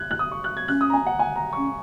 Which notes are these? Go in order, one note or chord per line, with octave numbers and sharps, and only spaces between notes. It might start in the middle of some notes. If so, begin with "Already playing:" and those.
Already playing: F#6 G#6
F#6
D#6
C#6
F#6
G#6
C#4 F#6
D#6
A#5
G#5
F#5
G#5
A#5
C#4 C#6